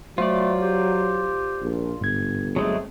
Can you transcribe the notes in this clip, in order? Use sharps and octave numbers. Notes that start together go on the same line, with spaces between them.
F#3 A3 F4 C5 D5
G4
A#1
G1 G#2 G#6
F#3 G#3 A3 C4 G#4